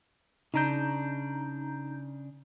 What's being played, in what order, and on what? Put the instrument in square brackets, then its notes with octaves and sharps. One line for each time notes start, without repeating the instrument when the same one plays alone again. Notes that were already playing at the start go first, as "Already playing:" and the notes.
[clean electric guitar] C#3 D4 [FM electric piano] D#4 A#5 G6